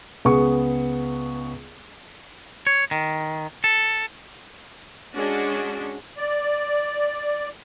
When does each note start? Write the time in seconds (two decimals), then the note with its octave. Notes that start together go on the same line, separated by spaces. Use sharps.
0.25 C#2 B3 G#4 C#6
2.67 C#5
2.91 D#3
3.64 A4
5.15 G#3 C#4 D4 F#4
6.18 D5